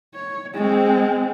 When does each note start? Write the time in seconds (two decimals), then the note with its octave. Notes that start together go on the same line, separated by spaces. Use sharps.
0.14 C#5
0.54 G#3 C4